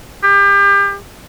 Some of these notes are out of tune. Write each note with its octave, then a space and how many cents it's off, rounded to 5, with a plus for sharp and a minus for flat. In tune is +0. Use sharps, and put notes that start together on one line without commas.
G4 +35